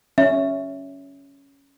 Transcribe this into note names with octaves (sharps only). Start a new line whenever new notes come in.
C#4 E5